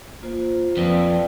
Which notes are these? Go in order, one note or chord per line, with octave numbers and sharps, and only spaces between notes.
A#3 F4 C5
F2 B4 D5